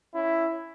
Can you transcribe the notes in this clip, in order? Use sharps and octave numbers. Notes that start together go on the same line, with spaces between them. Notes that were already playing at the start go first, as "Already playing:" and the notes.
C#4 E4